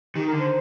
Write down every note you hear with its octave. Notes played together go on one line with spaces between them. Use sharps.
D#3 G4
A#4
D3
C5